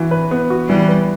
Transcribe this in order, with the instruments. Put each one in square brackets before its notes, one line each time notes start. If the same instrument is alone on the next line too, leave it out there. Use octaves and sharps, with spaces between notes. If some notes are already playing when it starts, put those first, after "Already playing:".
Already playing: [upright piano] E3 F#4
B4
B3
F#4
[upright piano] E3 [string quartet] G3
[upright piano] B4